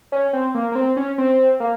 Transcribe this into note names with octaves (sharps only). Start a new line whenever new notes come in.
C#4
C4
A#3
A#3
C4
C#4
C4
A#3